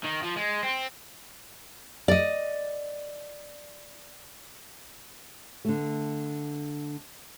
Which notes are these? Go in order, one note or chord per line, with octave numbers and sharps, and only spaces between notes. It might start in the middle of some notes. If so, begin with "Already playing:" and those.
D#3
F3
G#3
C4
D5 D#5
D3 A3